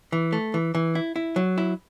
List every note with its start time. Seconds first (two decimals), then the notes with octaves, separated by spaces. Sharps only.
0.12 E3
0.33 A3
0.54 E3
0.75 E3
0.95 E4
1.16 E4
1.36 F#3
1.58 E4